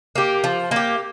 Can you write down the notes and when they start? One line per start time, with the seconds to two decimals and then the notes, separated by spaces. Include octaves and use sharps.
0.16 A#3 G4
0.44 F3
0.71 A#3 G4